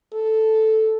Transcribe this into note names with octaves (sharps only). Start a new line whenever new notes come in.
A4